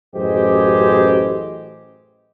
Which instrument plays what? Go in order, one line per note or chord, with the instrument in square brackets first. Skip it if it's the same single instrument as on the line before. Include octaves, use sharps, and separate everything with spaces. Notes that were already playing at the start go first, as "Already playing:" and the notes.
[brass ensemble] A1 F#2 G4 G#4 C5 D#5